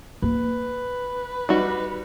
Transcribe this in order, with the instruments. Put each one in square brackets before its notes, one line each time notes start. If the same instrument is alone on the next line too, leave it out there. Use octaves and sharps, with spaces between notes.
[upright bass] A#3 [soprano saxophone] B4
[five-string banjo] G3 F#4 [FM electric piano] D#4